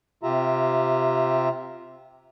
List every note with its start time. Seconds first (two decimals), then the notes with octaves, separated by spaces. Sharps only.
0.23 C3 F4 G4 E5 A#5